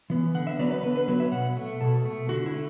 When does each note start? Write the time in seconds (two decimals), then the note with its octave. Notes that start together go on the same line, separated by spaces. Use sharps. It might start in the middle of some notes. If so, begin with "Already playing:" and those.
0.10 E3 B3
0.34 D3 F#5
0.47 E5
0.59 F#3 B3 D5
0.71 B4
0.83 D3 B4
0.96 B4
1.08 F#3 B3
1.20 E5
1.32 B2 F#5
1.57 A3
1.81 B2 A4
2.05 A3
2.29 D3 F#4
2.46 E4
2.54 A3